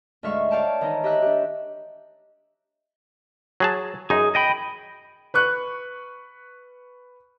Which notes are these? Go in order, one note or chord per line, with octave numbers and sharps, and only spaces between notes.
D2 G#2 G#3 E5 F5 C#6
C#5 D5 F5 G5 A5
D#3 E3 D#4
G4 D#5 E5 E6 F#6
D4 G4
F#3 G#4 A5
F#2 D#4 G#4
D#5 G5 B5
B4 C#6 F#6